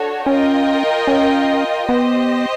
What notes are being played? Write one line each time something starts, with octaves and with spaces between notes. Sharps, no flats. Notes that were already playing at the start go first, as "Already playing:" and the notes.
Already playing: D4 F#4 A4 C#5
C#4 F4 A#4 D#5 G5
C#4
B3 G4 C5 D#5